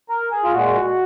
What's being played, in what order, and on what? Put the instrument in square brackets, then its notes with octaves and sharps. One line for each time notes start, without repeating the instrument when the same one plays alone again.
[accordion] A#4
G#4
F4
A#2 G#3 F#4